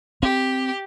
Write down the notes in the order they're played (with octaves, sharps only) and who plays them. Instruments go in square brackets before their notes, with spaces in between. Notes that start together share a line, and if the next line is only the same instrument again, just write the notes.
[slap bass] C4 [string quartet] G4